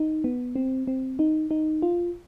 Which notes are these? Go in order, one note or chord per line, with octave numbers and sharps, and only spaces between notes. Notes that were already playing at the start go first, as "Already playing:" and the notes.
Already playing: D#4
B3
C4
C4
D#4
D#4
F4